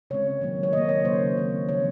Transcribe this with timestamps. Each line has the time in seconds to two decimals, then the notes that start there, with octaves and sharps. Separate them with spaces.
0.10 C#3 G#3 C4 C#5
0.41 D#3 F#3 A#3
0.63 C#5
0.73 D#3 A#3 D#5
0.89 C#5
1.05 C#3 F#3 A#3 C5
1.37 D#3 G#3 C4
1.69 C#3 F3 C4 C#5